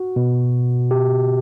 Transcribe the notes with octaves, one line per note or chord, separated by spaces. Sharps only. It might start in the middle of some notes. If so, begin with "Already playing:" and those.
Already playing: F#4
B2
G4